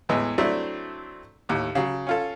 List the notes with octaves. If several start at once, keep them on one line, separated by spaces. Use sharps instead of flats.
E2 A2 E3 G#3
F#3 A3 C4 D4 E4
D#2 A2
C#3 F#3
C#4 F4 A4